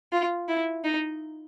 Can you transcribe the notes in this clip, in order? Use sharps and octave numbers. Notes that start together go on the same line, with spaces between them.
F4
E4
D#4